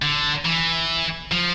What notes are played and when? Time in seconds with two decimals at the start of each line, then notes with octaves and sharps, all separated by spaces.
0.02 D3
0.45 E3
1.32 F3